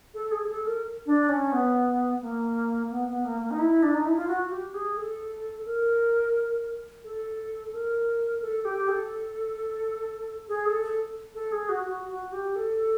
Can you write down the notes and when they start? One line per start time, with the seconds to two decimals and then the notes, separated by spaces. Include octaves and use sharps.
0.14 A4
0.31 G#4
0.43 G#4
0.49 A4
0.66 A#4
1.06 D4
1.29 C#4
1.52 B3
2.21 A#3
2.90 B3
3.07 B3
3.25 A#3
3.42 A#3
3.51 D#4
3.59 E4
3.83 D4
3.94 D#4
4.05 E4
4.16 F4
4.28 F#4
4.51 G4
4.74 G#4
4.97 A4
5.65 A#4
7.04 A4
7.73 A#4
8.42 A4
8.65 G4
8.88 A4
10.48 G#4
10.66 A4
10.83 A4
11.35 A4
11.52 G#4
11.69 F#4
11.86 F#4
12.09 F#4
12.32 G4
12.56 A4